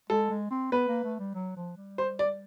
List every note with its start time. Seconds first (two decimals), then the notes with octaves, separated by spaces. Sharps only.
0.10 G#3 A4
0.30 G#3
0.51 C4
0.72 B3 B4
0.88 A#3
1.04 A3
1.19 G3
1.35 F#3
1.56 F3
1.77 G3
1.98 C5
2.19 D5